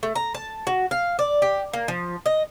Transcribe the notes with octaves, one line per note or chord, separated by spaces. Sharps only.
A3
A#5
A5
F#4
F5
D5
G4
A#3
F3
D#5